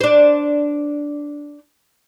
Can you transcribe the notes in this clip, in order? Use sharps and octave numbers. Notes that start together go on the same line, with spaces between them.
D4 C5